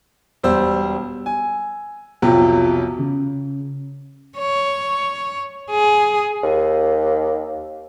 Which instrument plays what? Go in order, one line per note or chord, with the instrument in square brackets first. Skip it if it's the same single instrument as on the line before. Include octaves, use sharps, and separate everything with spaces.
[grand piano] E1 G3 C5 E6
G#5
B1 F2 C3 F3 F#3
[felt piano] C#3
[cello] C#5
G#4
[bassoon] D#2